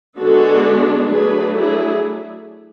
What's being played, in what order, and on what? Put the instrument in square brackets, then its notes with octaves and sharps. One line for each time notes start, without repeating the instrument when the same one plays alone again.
[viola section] D3 G#3 B3 D4 F#4 A4
F#3 A3 D4 G#4 B4
E4 G#4